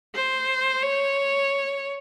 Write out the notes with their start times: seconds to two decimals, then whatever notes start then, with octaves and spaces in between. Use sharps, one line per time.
0.15 C5
0.82 C#5